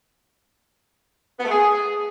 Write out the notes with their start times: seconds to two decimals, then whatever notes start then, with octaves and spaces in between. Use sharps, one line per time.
1.39 B3
1.45 A3
1.50 G#4